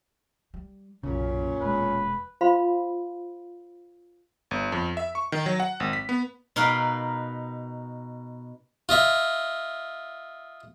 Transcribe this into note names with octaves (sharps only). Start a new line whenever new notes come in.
G3
B1 F#2 A#2 C#3 C#4
E1 E2 G#3 B4
F4 C5 F5 B5 C6
G1
F2
E5
C#6
D#3
F#3
F#5
G#1
B6
B3
B2 D#4 A#4 B4 F5 G5
F4 D#5 E5